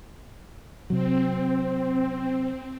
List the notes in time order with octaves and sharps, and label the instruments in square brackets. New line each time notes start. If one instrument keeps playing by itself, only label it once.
[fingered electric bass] C3 F#3 [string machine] C4